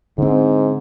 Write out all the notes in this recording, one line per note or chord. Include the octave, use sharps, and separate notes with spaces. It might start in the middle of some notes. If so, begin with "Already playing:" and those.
G#2 D3 C4